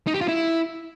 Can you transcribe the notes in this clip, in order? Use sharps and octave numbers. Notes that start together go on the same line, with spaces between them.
D#4
G4
F4
E4